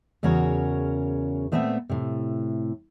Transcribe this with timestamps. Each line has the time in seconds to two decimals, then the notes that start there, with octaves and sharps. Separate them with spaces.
0.23 E2 C#3 C#4 F#4 A#4 C#5
1.52 A#2 A3 B3 C4 G#4 E5
1.89 A2 C3